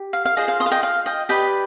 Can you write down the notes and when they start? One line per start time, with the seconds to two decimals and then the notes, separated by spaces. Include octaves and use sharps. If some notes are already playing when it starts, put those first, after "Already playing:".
Already playing: G4
0.13 F5
0.25 F5
0.37 F4 G#4 C5 D#5
0.48 F5
0.60 C6 D#6
0.66 F5
0.71 D#5 G5
0.83 F5
1.06 D#5 G5
1.29 G4 B4 D5 D#5 G5